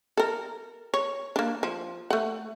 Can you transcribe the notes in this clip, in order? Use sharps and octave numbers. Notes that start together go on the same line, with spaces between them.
A4 A#4
C#5
A#3 D4
F3
A3 F#5